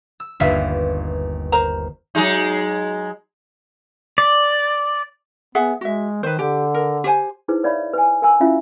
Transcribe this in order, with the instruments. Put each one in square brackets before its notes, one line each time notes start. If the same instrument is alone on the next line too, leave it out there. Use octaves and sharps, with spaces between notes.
[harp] E6
[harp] G1 D#2 B4 [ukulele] F4 E5 F5
[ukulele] A#4 C5 A#5
[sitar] F#3 G#3 D#4
[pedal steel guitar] D5
[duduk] B3 [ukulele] G#4 E5 F#5
[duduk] G#3 [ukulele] F#4 E5
[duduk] D#3 [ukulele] B4 C5
[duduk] D3 [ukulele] G4
[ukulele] A#4
G4 C5 G#5
[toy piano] D#4 E4 G#4 B4 C5
B4 C#5 D5 E5 F5 B5
B4 G#5
A#4 F5 G#5 A#5 E6
C#4 E4 F4 E5 F5